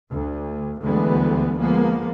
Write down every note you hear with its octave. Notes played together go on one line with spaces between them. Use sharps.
D2
D2 D3 E3 G3 G#3 B3
F3 G#3 A#3 B3